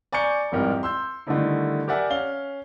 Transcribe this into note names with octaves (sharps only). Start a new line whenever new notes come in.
D5 G#5 A#5 C#6 G6 C#7
A1 F2 G#2 G3 A#4 G5
C6 E6 G6
D3 D#3 G3 A3 D#4 E4
G4 A#4 D5 E5 F#5 G#5
C#4 F5 G7